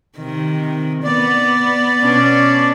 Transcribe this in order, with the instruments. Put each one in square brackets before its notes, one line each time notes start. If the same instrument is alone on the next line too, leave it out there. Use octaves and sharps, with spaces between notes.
[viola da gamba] C3 D#3
[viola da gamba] B3 [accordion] D5
[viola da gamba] B2 C#4 D4